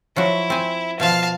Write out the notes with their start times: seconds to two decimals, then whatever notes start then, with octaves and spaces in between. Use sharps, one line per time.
0.16 F3 F#3 E4 F#4
0.50 C4 G#5
1.00 B2 F3 F5 A5